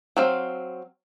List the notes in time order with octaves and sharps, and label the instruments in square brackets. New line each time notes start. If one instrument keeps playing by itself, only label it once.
[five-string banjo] F#3 C4 F5